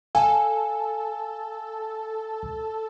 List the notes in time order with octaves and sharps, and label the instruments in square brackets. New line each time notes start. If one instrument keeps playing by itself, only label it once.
[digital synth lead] A4 [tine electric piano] F5 G#5